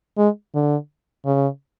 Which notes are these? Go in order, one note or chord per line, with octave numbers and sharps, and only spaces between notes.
G#3
D3
C#3